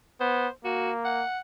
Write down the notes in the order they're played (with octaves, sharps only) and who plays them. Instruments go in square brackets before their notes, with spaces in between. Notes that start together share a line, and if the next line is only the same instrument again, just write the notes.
[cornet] B3 [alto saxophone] C5
[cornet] A#3 [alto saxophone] F#4
[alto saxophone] F#5